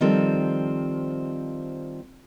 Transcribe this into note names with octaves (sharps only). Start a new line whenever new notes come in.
D#3 F3 G3 C4 A4